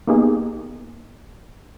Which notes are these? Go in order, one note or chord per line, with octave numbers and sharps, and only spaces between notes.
A#3 B3 D#4 G4 G#4